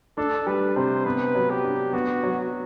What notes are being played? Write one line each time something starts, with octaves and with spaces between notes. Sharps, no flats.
D4 A4
G3 B4
C3 C5
B3 B4
F#3
G4
D4
B3 F#4
F#3